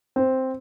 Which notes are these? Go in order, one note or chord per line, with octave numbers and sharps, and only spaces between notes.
C4